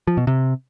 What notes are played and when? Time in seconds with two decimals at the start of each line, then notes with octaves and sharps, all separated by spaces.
0.07 F3
0.17 B2
0.27 C3